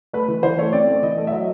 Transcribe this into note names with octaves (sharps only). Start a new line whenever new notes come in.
A3 B4
E3
E3 C5
A3 C#5
C4 D5
A3
E3 D#5
A3
E5
F#3 D#5